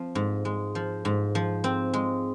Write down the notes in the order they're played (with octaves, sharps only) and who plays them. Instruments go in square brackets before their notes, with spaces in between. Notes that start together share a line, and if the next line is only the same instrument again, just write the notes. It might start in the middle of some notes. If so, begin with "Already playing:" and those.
Already playing: [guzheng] F3 C4
G#2
G#3
F3
G#2
F3
C4
G#3